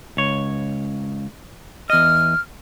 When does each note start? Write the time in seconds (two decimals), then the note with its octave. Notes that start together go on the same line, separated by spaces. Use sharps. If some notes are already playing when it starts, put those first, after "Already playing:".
0.17 C#2 C#5
1.90 E2 D#5 F6